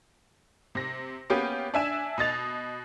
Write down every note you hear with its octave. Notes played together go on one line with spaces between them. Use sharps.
C3 A#6
A#3 B3 C#4 G4
D4 E5 G#5 E7
B2 D#5 A6 F7